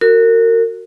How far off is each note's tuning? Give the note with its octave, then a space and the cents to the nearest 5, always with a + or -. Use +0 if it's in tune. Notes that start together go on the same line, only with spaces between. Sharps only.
F#4 +0 A#4 -30